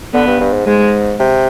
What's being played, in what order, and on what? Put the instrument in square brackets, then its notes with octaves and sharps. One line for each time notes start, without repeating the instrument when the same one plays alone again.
[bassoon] D3 [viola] B3
[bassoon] G2
G2
G#2
[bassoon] G#2 [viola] G#3
[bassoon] C3